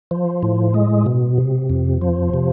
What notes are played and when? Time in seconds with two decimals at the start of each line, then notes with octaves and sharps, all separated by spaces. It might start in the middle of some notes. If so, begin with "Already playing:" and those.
0.11 F3
0.43 A2
0.74 G#3
1.06 B2
1.38 C3
1.69 F2
2.01 F3
2.34 C3